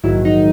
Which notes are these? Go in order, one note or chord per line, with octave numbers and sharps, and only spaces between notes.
A#1 G#2 D#3 F#3 E4
D#4